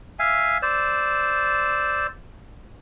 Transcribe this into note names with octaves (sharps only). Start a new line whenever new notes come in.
E5 F5 G#5
C5 D5 E6